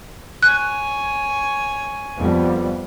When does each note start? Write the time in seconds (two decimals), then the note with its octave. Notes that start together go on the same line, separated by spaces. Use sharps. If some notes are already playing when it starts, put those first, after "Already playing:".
0.43 C#5 G#5 F#6
2.17 F2 G3 B3